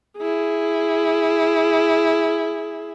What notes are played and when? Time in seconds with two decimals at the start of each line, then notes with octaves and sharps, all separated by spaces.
0.18 E4 G#4